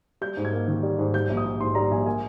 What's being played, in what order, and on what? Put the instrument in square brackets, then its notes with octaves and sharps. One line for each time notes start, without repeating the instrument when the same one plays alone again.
[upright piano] G3 G6
G#2
G#6
A#3
D#3
G3
G#2
G3 G6
A#1
D#6
A#1
G#2 C6
G3 A#5
A#1 G#5
A#3 G#5